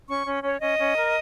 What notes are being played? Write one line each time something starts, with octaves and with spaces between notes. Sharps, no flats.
C#4 C#6
C#4
C#4 C#5
C#4 D#5
C#4
A#4